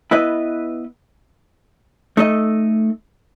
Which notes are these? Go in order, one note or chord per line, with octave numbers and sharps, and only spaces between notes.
B3 E4 B4 D#5
A3 D#4 A4 D#5